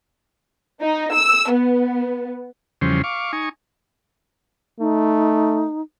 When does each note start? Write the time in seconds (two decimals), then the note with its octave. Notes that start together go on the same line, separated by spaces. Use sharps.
0.81 D#4
1.13 E6
1.52 B3
2.81 E2 C#3 F3 G3 C#4 C5
3.04 F5 C#6 D6
3.33 D#4 G#5 C#6
4.80 A3 D#4